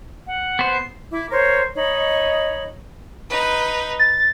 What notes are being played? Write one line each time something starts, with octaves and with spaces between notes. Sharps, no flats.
F#5
B3 C5
C7
E4 D6
A#4 C5 C#5
D#4 C#5 D#5 B5
D#4 B4
A6